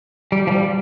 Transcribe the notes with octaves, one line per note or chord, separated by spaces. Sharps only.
G3
F3
G3